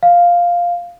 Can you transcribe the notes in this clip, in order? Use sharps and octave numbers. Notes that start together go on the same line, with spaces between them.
F5